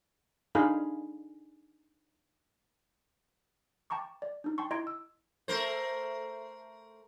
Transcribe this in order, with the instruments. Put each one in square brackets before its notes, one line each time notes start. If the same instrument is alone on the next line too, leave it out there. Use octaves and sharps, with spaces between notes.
[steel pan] D4 D#4 G#4 F5 B5
[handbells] G5 A5 A#5 C#6 D6
D5
D4 D#4
G5 A5 C6 C#6
E4 D#5 A#5 C6 G#6 D7
E6
[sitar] A3 A#4 C5